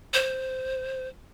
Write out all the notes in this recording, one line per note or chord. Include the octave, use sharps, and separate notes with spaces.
C5